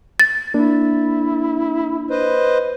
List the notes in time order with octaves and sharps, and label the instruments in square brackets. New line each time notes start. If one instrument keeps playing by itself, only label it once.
[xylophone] A6
[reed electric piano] A#3 D4 [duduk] E4
[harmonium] B4 C5 D#5